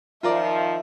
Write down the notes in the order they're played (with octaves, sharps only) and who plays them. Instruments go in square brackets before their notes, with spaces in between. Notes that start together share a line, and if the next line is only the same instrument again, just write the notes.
[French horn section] D#3 F3 [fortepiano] F4 A#4 D5 [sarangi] E5